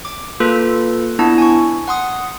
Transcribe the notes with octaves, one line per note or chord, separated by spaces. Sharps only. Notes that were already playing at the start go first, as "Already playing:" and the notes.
D6
A#3 F4 A4 B4
B3 D4 E4 A5
G#5 C#6
F#5 C6 D#6